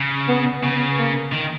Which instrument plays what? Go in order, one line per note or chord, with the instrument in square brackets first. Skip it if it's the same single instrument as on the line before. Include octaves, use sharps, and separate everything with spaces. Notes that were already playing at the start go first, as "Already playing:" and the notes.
Already playing: [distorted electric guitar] C#3
[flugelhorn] B3
[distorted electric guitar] C#3 [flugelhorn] B3
[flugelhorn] A#3
[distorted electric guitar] D#3